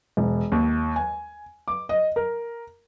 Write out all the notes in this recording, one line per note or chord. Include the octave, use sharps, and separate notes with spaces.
E1
D#2
G#5
D6
D#5
A#4